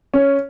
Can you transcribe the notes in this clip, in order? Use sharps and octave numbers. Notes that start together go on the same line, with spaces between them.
C#4